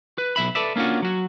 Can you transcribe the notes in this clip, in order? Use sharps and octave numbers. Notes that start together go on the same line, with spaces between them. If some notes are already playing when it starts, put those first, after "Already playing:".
B4
B1 E5 B5
A4 B4 D5 E5
A#3 C#4 D4 F4 F#4
F#3 F#4